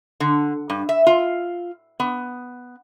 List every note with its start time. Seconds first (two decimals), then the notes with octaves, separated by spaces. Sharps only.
0.20 D3
0.70 G2
0.89 E5
1.07 F4
2.00 B3